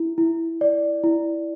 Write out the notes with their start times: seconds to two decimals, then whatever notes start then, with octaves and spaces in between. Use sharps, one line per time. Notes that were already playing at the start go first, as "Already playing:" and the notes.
Already playing: E4
0.18 E4
0.61 D5
1.04 E4